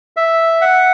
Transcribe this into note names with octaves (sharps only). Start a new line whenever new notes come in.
E5
F#5